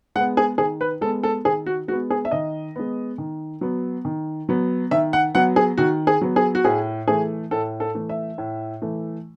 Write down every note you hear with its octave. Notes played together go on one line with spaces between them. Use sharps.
G#3 B3 F#5
G#4
D#3 G#4
B4
G#3 B3 A4
A4
D#3 G#4
F#4
G#3 B3 F#4
G#4
E5
D#3 D#5
G#3 B3
D#3
F#3 B3
D#3
F#3 B3
D#3 E5
F#5
F#3 B3 F#5
G#4
D#3 F#4
G#4
F#3 B3
G#4
F#4
A2 G#4
E3 A3 G#4
A2 A4
A4
E3 A3
E5
A2
E3 A3